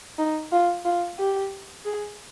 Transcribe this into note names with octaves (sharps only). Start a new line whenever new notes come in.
D#4
F4
F4
G4
G#4